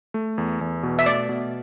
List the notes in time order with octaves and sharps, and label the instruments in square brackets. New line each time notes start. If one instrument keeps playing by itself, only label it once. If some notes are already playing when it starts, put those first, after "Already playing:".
[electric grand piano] A3
E2
E2
B2
[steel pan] E5
[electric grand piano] A3 [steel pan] D5
[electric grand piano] B2